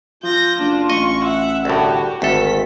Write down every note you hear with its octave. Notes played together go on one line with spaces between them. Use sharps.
F3 F4 G6 A#6
F#1 D4
A1 D#5 C#6
E5 F#5
C2 A2 D3 F#4 G4
G#1 D2 D#3 A4 B6